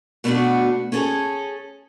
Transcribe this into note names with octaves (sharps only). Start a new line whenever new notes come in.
B2 A3 B3 C4 D4 F#4
C#4 G#4 A4 C5 C#5